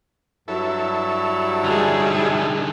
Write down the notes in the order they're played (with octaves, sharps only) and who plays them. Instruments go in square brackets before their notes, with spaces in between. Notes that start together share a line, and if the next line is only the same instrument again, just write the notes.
[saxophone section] G2 F#3 [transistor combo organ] E4 A4
[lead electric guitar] D3 D#4 [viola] G3 G#4